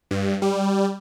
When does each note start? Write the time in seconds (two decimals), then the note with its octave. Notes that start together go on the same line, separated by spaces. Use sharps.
0.11 G2
0.42 G3